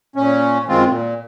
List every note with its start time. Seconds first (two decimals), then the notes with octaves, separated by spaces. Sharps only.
0.16 A#2 C#4
0.68 F#2 D#3 G#3 C4 F4
0.89 A#2